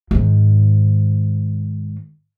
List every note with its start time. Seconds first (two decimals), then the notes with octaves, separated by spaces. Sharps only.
0.11 G#2 D#3